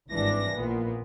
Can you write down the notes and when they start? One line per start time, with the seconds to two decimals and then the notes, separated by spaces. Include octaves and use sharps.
0.11 G#1 G2 E3 D4 A#6
0.55 A#1 A#2 B3